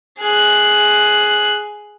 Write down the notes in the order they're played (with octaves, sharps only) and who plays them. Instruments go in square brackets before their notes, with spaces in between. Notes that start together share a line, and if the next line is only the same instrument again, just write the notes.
[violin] G#4 F#6